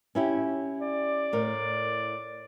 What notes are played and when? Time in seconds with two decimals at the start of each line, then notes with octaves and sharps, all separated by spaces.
0.15 C#4 E4 G4
0.81 D5
1.33 A2 A#4